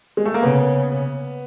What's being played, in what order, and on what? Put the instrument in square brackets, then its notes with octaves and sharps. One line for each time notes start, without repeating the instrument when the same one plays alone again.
[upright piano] G#3
A3
A#3
[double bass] C#3 [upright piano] B3